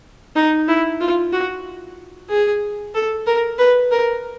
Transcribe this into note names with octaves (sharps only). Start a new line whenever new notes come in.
D#4
E4
F4
F#4
G#4
A4
A#4
B4
A#4